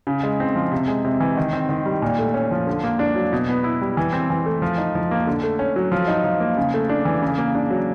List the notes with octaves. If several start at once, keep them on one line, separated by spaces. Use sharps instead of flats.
C#3
G#3
C4
F3
C3
G#3
C3
E3
D#3
C4
D#3
G3
A#2
A3
C#4
F3
D3
A#3
D4
F#3
B2
B3
E4
G3
E3
C4
E3
A3
F3
D#4
F3
A#3
D3
A3
C#4
F#3
F3
D#4
F3
A#3
C#3
A3
D4
E3
C#3
A#3
D4
F#3